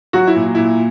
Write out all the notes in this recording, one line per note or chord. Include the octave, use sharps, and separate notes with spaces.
F#3 F#4
E4
A#2
A#2 E4